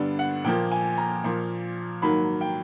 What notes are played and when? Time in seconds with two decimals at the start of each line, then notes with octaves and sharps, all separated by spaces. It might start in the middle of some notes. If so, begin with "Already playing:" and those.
Already playing: G2 D3 G3 B3 D5
0.19 F#5
0.44 A#2 F3 A#3 G5
0.72 G#5
0.98 A#5
1.24 A#2 F3 A#3
2.02 G#2 D#3 F#3 A#3 B5
2.41 G5